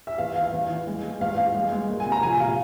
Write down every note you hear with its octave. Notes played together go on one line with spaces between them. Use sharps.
E5
E2 F5
E2 F5
E2
E3
G#3
G#3
E2 F5
E2 F5
G#3
G#3
A#3
G#5
C3
A#5
F3 G#5
A#2 F5